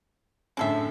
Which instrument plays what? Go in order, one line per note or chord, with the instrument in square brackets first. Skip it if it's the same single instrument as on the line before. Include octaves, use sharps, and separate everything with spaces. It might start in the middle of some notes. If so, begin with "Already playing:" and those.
[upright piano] F#2 A2 D3 [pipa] G#3 A4 E5